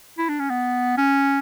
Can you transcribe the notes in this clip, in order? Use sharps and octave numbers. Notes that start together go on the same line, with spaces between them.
E4
D4
C#4
B3
C#4